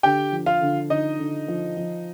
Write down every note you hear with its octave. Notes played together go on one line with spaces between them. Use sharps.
D3 G4 G5
F3
F4 F5
D3
D3 D#4 D#5
D3
F3
F3